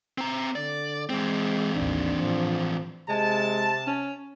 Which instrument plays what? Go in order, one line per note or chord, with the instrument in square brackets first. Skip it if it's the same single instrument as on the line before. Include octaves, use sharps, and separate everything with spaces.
[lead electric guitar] C4 A#5
[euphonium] D3 [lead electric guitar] D5
[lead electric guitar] E3 C4 [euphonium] G#3
[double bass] A1 D#2 [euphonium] D4
[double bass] A2 F3
[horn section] C3 A5 [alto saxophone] G#3
[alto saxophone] C#4